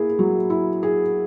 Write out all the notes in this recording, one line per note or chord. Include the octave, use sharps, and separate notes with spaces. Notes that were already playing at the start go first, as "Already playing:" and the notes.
Already playing: A#3 E4 G#4
F#3
E4
G#4